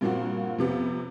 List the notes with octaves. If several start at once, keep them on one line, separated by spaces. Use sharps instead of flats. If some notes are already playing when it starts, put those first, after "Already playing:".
G2 A#2 F3 A#3 C4 F#4
F2 C3 B3